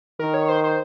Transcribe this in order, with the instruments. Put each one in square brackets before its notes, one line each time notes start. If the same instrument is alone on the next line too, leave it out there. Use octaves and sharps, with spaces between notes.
[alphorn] D#3 [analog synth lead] A#4
[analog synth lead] C#5
C5
C5